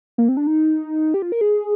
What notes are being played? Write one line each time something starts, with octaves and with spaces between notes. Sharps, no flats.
A#3
C4
D4
D#4
G4
F4
A#4
G#4